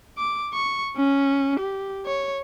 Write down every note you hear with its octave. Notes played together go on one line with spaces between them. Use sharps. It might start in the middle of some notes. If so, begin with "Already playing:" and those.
D6
C#6
C#4
G4
C#5